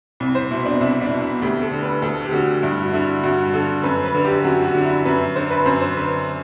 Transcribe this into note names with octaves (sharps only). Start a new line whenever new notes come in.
C2
C5
B2 E4
D4
C2 E4
D4
B2
E4
D2 G4
A4
D3
B4
D2 A4
G4
D3 F#4
G2 E4
F#4
D3 E4
G2 F#4
D3 A4
F#2 B4
B4
D3
G4
F#2 F#4
F#4
D3
E4
F#2 B4
D3 C5
B4
F#2 C5
C5
D3 B4